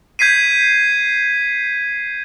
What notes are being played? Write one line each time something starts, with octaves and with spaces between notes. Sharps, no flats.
G6 G#6 B6 C7 D#7